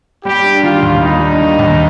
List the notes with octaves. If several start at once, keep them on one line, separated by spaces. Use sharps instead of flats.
G3 G4
D4
D#3 F4
D#2
G3 D#4
D4
D#3
D#2